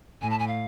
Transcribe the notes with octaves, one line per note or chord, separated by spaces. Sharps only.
A2 G#5
A5
G#5
F5